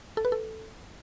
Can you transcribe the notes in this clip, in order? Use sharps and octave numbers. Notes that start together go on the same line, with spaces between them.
A4
B4
A4